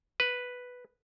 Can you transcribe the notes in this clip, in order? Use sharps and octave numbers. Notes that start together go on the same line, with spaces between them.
B4